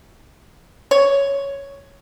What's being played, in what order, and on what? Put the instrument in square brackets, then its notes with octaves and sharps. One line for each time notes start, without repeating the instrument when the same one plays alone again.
[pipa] C#5